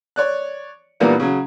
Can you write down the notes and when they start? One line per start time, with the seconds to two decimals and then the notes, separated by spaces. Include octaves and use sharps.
0.16 C#5 D5 F#6
1.00 A#2 E3 G3 A#3 B3 D4
1.20 C#3 F#3